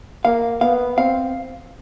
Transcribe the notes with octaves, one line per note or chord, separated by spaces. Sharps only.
A#3 F5
B3 F5
C4 F5